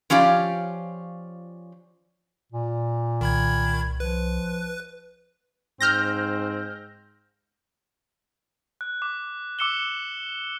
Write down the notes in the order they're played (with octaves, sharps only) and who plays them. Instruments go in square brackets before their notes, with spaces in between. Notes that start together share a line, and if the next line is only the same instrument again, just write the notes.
[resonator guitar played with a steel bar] F3 C#4 F4 G4 D5
[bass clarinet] A#2
[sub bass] C2 [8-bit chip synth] D#3 B5 G#6
[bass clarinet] F3 [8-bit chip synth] B4
[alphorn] G#2 [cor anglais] C4 [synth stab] F6 G6 A#6
[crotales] F#6
D6
D6 E6 C#7 E7 G7